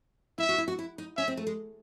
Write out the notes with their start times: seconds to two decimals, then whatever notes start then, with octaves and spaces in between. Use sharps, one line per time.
0.38 E4 E5
0.49 F#4
0.58 E4
0.68 F#4
0.79 E4
0.98 D#4
1.17 C#4 E5
1.28 C4
1.37 A3
1.47 G#3